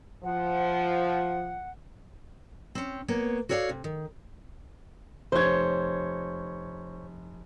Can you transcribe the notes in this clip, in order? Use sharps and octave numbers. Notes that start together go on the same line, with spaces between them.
F3 F#5
C4 C#4
A#3 B3 C#5
F#4 A4 C#5 D5 F5
C3
D#3
F1 C5 C#5 G#6